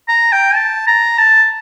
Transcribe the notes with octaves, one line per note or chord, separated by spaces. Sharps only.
A#5
G5
A5
A#5
A5